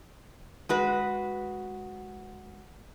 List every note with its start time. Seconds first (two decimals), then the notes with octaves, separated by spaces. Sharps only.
0.69 G#3 F#4 B4